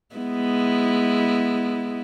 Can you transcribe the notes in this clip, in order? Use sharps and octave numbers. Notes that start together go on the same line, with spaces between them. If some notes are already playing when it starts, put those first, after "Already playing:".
G#3 B3 E4